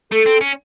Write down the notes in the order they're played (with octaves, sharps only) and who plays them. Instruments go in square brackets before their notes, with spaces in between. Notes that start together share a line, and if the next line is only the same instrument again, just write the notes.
[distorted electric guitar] A3 [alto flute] A4
[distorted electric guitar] C4
C#4